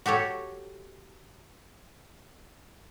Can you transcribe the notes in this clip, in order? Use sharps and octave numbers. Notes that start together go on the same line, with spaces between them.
F#4 G4 A4 C#5